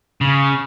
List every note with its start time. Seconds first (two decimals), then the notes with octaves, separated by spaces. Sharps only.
0.21 C#3